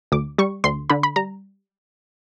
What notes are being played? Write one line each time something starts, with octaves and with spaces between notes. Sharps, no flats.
D2 D6
G3 C#6
D2 C6
D3 B5
B5
G3 A#5